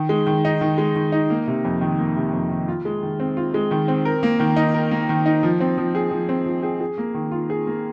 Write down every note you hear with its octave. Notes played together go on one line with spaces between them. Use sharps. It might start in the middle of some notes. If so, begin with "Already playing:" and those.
Already playing: D#3
G#3
D#3
D#4
D#3
G#3
D#3
D#4
A#3
C3
F2
D#3
A#3
C3
F2
D#3
F4
G#3
D#3
C4
F4
G#3
D#3
C4
A#4
A#3
D#3
D#4
A#4
A#3
D#3
D#4
F3
C4
F3
G#4
F3
C4
F3
G#4
G#4
A#3
D#3
F4
G#4
A#3